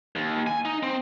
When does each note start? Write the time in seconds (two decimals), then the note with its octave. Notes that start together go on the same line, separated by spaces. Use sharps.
0.16 D#2
0.47 G#5
0.65 D#4
0.83 C4